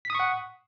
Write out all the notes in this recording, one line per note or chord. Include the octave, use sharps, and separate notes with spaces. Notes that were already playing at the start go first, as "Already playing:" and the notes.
F#5 C#6 D#6 B6